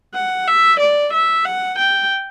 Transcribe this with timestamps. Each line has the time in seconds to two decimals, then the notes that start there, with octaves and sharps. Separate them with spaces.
0.15 F#5
0.47 E5
0.79 D5
1.13 E5
1.45 F#5
1.78 G5